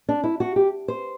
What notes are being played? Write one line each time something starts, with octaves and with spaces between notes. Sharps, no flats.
D4
E4
F#4
G4
C5